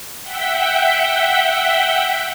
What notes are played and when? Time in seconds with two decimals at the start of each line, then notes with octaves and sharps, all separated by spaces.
0.23 E5 F#5 G5 G6 B6